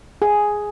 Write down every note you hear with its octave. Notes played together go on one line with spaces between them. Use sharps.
G#4